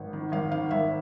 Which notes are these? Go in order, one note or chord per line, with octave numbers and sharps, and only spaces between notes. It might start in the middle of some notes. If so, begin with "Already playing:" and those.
Already playing: G#1
D#3
G#1 F5
D#3 F5
G#1 E5